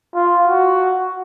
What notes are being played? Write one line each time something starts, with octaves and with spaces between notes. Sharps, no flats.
F4
F#4